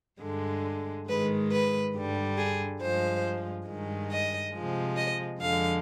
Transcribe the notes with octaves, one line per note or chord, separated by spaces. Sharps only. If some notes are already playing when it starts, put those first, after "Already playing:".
G2 D3 G#3
G#2 D#3 G#3 B4
B4
G2 D3 G3
G#4
G2 F3 G#3 C5
G2 D#3 G#3
D#5
C3 F3 G#3
D#5
F2 D3 G#3 F5